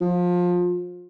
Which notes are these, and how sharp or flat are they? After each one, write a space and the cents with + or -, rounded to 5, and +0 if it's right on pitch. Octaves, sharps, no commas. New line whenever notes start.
F3 +25